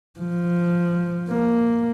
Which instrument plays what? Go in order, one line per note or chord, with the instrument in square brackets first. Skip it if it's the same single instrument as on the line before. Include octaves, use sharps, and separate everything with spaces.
[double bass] F3
A#3